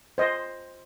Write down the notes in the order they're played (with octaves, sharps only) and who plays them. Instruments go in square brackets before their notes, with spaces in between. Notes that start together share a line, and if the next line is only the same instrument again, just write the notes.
[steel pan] C5 D#5